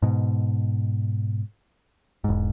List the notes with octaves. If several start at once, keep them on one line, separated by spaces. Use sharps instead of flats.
G#2 B2
E1 G#2